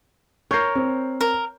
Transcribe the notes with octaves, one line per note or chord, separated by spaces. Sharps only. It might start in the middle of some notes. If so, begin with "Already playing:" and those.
A#4 C#5 G6 C7
C4
A#4